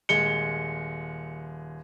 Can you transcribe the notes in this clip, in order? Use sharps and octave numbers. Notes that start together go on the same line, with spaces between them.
D#1 G#3 C#7 G7